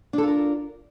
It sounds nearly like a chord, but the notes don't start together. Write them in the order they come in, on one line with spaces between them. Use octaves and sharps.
D4 A4 F4 A#4